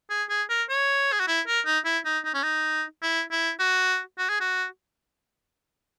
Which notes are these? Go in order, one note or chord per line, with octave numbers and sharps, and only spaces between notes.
G#4
G#4
A#4
C#5
G#4
F#4
E4
A#4
D#4
E4
D#4
D#4
C#4
D#4
E4
E4
F#4
F#4
G#4
F#4